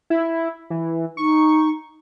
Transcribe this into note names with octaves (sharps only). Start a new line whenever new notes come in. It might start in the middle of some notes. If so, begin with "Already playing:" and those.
E4
E3
D#4 C#6